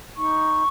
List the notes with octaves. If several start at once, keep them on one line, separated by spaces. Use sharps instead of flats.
D#4 C#6